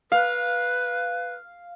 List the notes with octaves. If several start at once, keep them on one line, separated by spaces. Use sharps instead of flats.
B4 F5